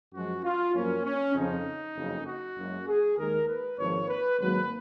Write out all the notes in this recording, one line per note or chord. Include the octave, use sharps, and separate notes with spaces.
F#2 F3 G#3 F#4
F4
F#2 F3 A#3 C#4
C#4
F2 C#3 F3 D#4
F#1 F2 C#3
F#4
F#1 F#2 C#3 G#3
G#4
D#2 D#3 G#3 A#4
B4
G#1 G#2 F3 A#3 C#5
B4
G#1 G#2 F#3 A#3 B4